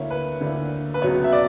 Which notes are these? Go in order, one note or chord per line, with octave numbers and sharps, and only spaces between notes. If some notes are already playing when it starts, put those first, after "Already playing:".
Already playing: D2 D3 A#3 E4 C#5
B4
D2 D3 A#3 E4
B4
C#2 B2 F#3 B3 C#5
E5
D5